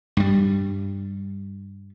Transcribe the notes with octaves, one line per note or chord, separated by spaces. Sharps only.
G2 G3